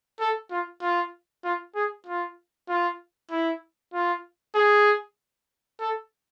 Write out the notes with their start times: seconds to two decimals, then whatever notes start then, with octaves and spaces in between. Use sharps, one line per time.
0.20 A4
0.51 F4
0.82 F4
1.44 F4
1.75 G#4
2.06 F4
2.69 F4
3.31 E4
3.94 F4
4.55 G#4
5.80 A4